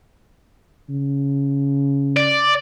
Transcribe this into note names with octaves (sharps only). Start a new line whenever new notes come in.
C#3
D5